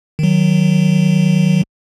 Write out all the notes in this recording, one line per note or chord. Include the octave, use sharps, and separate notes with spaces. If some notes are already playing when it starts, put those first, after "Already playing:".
D#3 F#3